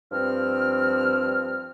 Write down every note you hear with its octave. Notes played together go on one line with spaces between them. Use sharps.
G2 F3 C4 F6